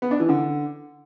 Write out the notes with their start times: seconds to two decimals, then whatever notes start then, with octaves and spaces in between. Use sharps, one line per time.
0.02 B3
0.11 D4
0.20 E3
0.29 D3